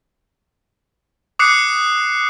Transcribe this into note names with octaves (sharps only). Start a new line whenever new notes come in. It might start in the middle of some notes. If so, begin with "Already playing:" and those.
D6 D#6 F#6 C7 C#7